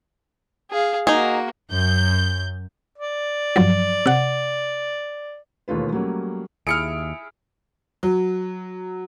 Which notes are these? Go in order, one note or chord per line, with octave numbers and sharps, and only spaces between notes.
G#4 F5
A#3 D#4 F#4 G#4
F#2 G6
D5
G2 F3 F#3
C3 F#5
E1 D#2 A3 F4 B4
F#3 G3 A3 A#3 C#4
D#2 E4 G#4 E5 F6 C#7 D7
F#3